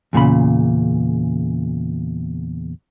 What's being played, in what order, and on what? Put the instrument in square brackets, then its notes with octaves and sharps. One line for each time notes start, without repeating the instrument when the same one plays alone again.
[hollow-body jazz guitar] E2 A#2 C#3 B5